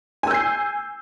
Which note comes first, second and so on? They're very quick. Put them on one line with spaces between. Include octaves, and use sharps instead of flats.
G#5 E6 G6 C7